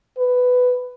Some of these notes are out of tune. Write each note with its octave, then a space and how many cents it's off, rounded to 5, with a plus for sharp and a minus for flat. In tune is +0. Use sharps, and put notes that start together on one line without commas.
B4 +10